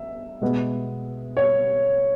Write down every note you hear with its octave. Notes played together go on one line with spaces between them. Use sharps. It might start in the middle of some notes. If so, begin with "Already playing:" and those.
Already playing: E5
B2 G#3 B3
C#5